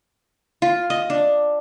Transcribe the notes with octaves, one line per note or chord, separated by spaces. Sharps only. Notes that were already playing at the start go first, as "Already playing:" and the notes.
F4
D#5
D4